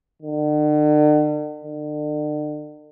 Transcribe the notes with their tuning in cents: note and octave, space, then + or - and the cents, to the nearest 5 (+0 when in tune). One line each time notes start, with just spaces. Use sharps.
D3 +45
D3 +40